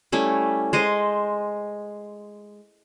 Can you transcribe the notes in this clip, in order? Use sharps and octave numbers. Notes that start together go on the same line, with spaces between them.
G3 A3 C#4 E4
G#3 C5 D#5